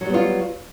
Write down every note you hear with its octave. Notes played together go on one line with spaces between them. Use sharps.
F#3 G3 B3 F4